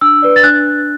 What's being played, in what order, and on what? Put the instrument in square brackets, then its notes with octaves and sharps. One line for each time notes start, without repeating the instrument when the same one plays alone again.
[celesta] D4 E6
B4 D5
A6
D4 F#6